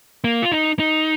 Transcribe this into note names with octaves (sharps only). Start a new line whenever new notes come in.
A#3
F4
D#4
D#4